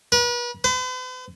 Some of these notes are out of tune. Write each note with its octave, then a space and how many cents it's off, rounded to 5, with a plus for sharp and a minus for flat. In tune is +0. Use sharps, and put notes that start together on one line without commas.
B4 -40
B4 +45